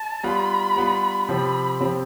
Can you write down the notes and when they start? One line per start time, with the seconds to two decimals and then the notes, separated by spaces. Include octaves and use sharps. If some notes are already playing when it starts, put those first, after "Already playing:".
Already playing: A5
0.23 G3 B3 F4 B5
0.76 G3 B3 F4
1.28 C3 F3 C4 G4 B5
1.80 C3 F3 C4 G4